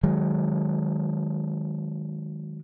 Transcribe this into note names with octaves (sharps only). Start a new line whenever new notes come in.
D#3 F#3 G#3